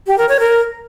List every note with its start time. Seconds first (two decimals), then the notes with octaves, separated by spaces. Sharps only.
0.07 G4
0.18 A#4
0.29 C#5
0.40 A#4